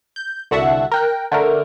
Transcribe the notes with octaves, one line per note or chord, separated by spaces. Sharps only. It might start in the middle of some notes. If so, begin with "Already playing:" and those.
G6
C2 D3 F#4 E5 F#5 A5
A#4 G5 F#6
D3 A3 A#4